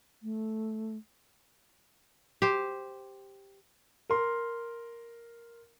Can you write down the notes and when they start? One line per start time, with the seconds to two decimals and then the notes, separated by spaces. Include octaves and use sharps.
0.23 A3
2.42 G4 C5
4.10 A#4 C6